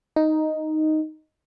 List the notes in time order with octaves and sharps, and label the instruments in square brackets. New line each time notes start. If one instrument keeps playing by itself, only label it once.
[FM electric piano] D#4